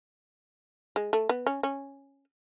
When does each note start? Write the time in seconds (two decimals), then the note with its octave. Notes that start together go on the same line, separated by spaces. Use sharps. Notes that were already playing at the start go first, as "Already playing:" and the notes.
0.96 G#3
1.13 A3
1.29 B3
1.47 C#4
1.63 C#4